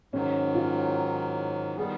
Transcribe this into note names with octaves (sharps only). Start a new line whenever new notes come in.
G#2 D#3 F#3 C#4
F4
D#3 G3 B3 G#4